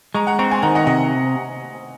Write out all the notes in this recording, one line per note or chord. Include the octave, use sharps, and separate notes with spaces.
G#3 A#5 C#6
F#5 A#5
C4 A#5 C#6
G#5 C6
D#3 F#5 A#5
D#5 F#5
C3 D#5 F#5